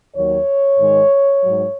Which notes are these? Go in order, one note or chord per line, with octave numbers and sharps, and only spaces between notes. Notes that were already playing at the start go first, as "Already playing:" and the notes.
D#2 D#3 F#3 C#5
G#2 D#3 G#3
G#2 F#3